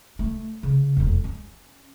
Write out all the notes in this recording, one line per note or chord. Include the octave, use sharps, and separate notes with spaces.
A3
C#3
E1 F2
C#4